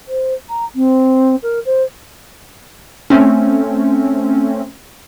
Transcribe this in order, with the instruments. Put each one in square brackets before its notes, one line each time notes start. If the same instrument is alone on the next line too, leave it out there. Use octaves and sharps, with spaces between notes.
[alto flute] C5
A#5
C4
A#4
C5
[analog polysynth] A3 C4 C#4